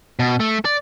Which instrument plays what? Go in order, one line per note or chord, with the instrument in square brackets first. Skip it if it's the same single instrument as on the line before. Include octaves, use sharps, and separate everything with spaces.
[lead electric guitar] B2
A3
D5